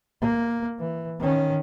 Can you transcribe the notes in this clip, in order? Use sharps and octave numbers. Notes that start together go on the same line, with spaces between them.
A#3
E3
D#3 C#4